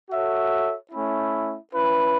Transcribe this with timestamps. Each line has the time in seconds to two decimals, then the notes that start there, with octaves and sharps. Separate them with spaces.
0.10 F#4 A4 C#5 E5
0.91 A3 C#4 E4
1.71 C#4 E4 B4